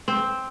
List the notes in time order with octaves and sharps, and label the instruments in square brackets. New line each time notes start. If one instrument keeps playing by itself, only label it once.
[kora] C4